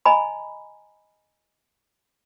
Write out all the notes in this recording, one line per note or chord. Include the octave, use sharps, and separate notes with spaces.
D#5 G#5 A#5 B5